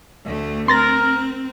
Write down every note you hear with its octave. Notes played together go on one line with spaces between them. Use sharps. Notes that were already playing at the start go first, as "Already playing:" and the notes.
D2 A3
C4 A#4 C6 A6 A#6